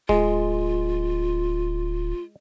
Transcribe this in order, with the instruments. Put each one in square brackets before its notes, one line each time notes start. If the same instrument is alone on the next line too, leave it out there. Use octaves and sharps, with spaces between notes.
[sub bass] D1 [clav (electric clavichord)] G#3 [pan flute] F4